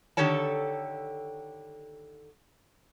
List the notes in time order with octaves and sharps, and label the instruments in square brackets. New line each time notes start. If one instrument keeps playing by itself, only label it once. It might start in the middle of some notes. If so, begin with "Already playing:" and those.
[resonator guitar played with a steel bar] D3 D#3 G4 A4 C#5 A5